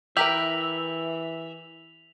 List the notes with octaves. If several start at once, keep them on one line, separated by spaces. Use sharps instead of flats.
E3 G4 A#4 B4 E5 B6 F7 F#7